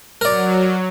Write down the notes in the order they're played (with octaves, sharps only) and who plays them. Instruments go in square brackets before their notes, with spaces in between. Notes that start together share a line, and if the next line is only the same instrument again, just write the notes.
[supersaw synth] F#3 [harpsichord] A#4 D5